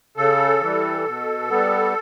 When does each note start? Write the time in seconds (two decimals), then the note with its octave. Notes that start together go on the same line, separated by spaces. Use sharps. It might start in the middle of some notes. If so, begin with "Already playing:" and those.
0.17 C#3 A4
0.61 E3 G3
1.06 B2
1.50 G3 B3